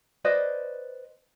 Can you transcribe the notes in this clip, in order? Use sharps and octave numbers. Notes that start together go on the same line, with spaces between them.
B4 C5 D5 D#5